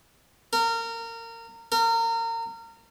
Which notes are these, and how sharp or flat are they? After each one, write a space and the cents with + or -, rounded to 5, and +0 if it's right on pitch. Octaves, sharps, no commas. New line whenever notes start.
A#4 -25
A#4 -30